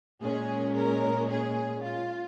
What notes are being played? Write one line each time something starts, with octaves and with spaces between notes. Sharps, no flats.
A#2 G#3 C#4 G#4
A#4
G#4
F4